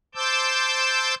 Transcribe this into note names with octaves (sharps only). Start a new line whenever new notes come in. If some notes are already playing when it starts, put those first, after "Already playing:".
C5 A5 D6 E6 G6